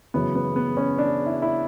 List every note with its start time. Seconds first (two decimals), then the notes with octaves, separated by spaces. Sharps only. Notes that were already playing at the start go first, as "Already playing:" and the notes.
0.14 F#2 C#3 E3 B3
0.35 B3
0.56 B3
0.77 C#4
0.98 D4
1.26 E4
1.42 E4